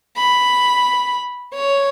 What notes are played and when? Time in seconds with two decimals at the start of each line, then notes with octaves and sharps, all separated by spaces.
0.17 B5
1.54 C#5